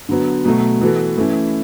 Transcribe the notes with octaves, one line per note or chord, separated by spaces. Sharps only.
D3 F#3 B3
B2 F#3 A3
E3 B3 F#4 A4
E3 A3 C#4 E4